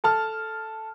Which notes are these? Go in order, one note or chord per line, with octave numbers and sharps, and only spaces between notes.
A4 A5 F6